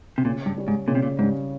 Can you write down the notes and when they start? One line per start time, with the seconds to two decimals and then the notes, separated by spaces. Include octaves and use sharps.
0.18 C3
0.25 A#2 C#3
0.46 G2
0.57 G3 C#4
0.68 G#2
0.88 A#2 C#3
0.95 C3
1.02 A#2
1.19 G#2 G3 C#4